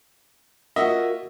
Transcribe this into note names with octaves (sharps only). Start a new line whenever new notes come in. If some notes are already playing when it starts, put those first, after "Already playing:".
A#3 F4 F#4 D#5 E5